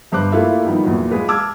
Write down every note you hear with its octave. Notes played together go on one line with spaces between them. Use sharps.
G1 G2 C5 D6 F#6
A3 A#3 E4 F4 A4 E5
D#3 F3 G3 B3 D#4
E2 A#2 F#3
G#3 F4 G#4 B4
A5 D6 E6 F6 G#6